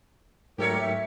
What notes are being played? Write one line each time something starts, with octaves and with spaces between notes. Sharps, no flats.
G#2 F#3 A3 G4 A4 A#4 C#5
E5